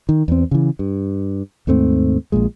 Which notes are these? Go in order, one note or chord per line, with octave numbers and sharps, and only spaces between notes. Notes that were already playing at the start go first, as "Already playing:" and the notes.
D#3
E2 C4
C#3 E3
G2
D#2 G#2 A3 C4
A#1 D#2 A#2 G#3